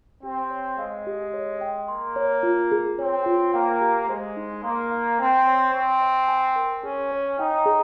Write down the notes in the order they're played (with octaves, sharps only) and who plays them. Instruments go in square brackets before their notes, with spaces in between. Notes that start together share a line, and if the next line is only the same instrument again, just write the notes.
[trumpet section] C4 [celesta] G4
[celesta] C#5
[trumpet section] G#3 [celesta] F5
[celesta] G4
C#5
G5
[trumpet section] A#3 [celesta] C6
[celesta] C#5
F4
G#4
[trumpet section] C4 [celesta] C#5
[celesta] F4
[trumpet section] A#3 [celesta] G5
[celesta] G4
[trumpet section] G#3 [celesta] C5
[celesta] D#4
[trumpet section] A#3 [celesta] C6
[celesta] F5
[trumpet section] C4 [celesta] G#5
[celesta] C#5
[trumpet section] C4 [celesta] C#6
[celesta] D#5
G#5
A#4
[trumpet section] C#4 [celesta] G#4
[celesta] C#5
[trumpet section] D#4 [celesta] G5
[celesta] G#4